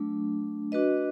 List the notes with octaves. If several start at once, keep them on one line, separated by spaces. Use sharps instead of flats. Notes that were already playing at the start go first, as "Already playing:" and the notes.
Already playing: F#3 A3 D4
D4 F#4 B4 D#5